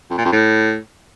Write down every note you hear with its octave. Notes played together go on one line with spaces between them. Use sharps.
F2
A#2
F2
A2